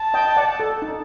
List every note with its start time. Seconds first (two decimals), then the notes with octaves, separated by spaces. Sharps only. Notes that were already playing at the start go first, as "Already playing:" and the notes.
Already playing: A5
0.14 D#5 G5
0.37 D5 F#5
0.60 A4
0.82 D#4